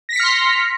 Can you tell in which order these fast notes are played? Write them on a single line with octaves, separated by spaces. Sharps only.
A#6 B6 C#7 F6 C6